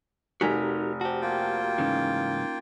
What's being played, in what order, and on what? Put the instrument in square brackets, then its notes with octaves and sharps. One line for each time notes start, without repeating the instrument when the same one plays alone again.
[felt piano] F1 G#5 B6 [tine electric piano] D#4 [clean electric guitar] F#4 G4 A#4
[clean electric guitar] F#4 G4 [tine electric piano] C5 A5
[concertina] A#3 F4 G5
[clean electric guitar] G#2 C#3 E3 [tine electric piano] C#4 D#4